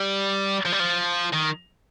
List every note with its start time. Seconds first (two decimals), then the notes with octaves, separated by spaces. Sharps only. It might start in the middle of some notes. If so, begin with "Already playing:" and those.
Already playing: G3
0.65 F3
0.72 G3
0.80 F3
1.33 D#3